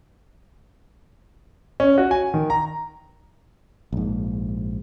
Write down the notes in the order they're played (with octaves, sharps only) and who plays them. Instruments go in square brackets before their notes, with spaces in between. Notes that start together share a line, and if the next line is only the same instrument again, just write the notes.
[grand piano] C#4
F#4
G#5
D#3
A#5
[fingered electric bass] A#1 G#2